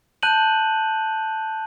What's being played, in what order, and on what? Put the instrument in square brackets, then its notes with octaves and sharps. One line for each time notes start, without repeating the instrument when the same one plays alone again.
[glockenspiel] A5 F#6 G6 D#7 F#7